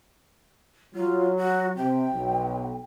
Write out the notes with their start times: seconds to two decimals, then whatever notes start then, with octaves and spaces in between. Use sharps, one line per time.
0.95 F#3 F4
1.37 F#4
1.77 C3 G5
2.14 B1